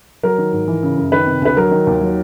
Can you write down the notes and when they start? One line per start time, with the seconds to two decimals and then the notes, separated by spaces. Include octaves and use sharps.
0.23 F#3 A#4
0.38 D#3
0.53 G#2
0.68 E3
0.83 C#3
0.98 F#2
1.12 D#3 B4
1.27 C3
1.41 D2 B4
1.57 F#3 A#4
1.71 D#3
1.87 D#2
2.01 F#3